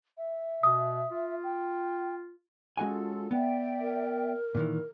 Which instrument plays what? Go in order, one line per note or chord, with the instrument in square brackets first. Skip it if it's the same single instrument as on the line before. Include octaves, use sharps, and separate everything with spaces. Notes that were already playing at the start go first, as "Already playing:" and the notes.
[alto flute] E5
[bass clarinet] B2 [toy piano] D#6
[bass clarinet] F4
[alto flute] G5
[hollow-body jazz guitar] G#3 F#4 G#5 [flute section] C#4 F4 A4
[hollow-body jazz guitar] B3 [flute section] D5 E5 G5
[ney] A#4
[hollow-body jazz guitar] A#2 D#3 E3